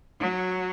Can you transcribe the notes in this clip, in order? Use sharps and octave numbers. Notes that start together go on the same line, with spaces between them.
F#3